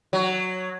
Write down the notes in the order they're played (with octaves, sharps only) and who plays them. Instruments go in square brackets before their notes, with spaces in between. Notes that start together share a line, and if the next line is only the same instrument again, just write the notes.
[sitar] F#3